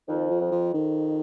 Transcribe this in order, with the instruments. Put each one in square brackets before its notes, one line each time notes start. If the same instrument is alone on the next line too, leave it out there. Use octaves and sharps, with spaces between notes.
[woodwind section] F2 [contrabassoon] D#3
[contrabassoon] F3
[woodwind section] F2
[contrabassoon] F3
[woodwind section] F2 [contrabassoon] D#3